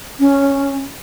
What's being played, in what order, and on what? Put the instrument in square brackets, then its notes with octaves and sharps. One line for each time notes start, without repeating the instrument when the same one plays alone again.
[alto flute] C#4